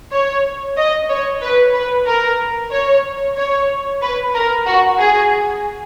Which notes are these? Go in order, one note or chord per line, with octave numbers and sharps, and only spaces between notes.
C#5
D#5
C#5
B4
B4
A#4
C#5
C#5
B4
A#4
F#4
G#4